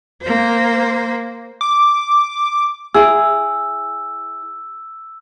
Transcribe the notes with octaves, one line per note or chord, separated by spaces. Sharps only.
A#3 C5
D6
E4 G#4 E6